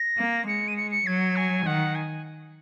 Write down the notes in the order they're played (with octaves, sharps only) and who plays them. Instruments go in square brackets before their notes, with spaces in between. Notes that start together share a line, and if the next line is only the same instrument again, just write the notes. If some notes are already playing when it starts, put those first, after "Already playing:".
Already playing: [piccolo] A#6
[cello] A#3
[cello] G#3 [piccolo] C#7
[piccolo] D#7
C#7
C#7
[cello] F#3 [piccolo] G#6
[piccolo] G#5
[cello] D#3 [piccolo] F#5
[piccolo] G#5